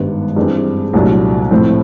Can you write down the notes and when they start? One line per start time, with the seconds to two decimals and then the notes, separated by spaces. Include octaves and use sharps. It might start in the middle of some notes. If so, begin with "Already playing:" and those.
Already playing: G#1 G2 D#3 G3 B3
0.36 G2 E3 G#3 C4
0.93 C2 A#2 F#3 A3 D4
1.51 A2 F3 A3 C4